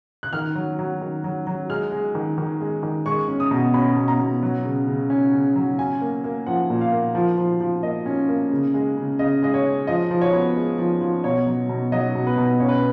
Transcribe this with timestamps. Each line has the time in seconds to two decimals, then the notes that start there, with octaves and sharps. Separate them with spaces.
0.23 F#6
0.33 D#3 F6
0.55 F#3
0.79 F#3
1.01 D#3
1.24 F#3
1.47 F#3
1.69 G#3 F6
1.92 G#3
2.15 D#3
2.38 D#3
2.61 G#3
2.83 D#3
3.06 G#3 C#6
3.28 C#4
3.40 D#6
3.51 B2
3.74 C#4 B5
3.97 B2
4.08 A#5
4.20 B2
4.43 F#3
4.65 C#3
4.88 C#3
5.10 C#4
5.33 C#3
5.56 F#3
5.79 C#4 G#5
6.01 A#3
6.24 A#3
6.46 F3 F#5
6.70 A#2
6.81 F5
6.92 A#3
7.15 F3
7.38 F3
7.60 F3
7.83 A#3 D#5
8.06 C#4
8.29 A#3
8.51 C#3
8.74 G#3
8.97 C#3
9.19 C#3 D#5
9.43 G#3 D#5
9.54 C#5
9.65 G#3
9.87 F3 D#5
10.11 F3
10.22 C#5
10.33 B3
10.56 G#3
10.78 F3
11.01 F3
11.24 B2 C#5
11.47 F#3
11.69 B2
11.92 F#3 D#5
12.15 B2
12.27 B4
12.38 B2
12.60 C#4 C#5
12.69 B4